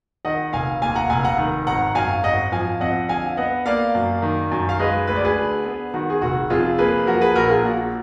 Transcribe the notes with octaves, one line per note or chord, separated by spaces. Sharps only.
D#3 D#5 F#5
F1 F5 G#5
D#2 F5 G#5
F#5 A#5
F1 F5 G#5
F#5 A#5
D#3
G#1 F#5 A#5
F#2 F5 G#5
G#1 D#5 F#5
F3 F5 G#5
F2 D#5 F#5
D3 F5 G#5
B3 D#5 F#5
A#3 D5 F5
F#2
D#3
F#2
F5
G#3 B4 D#5
D2 B4
D5
G#4 B4
D3
B3
D#3 F#4
G#4
F1 F#4
F2 F4 G#4
A#3 G#4 B4
F3 F#4 A#4
G#4 B4
A#1 F#4 A#4
F4 G#4
A#2 F#4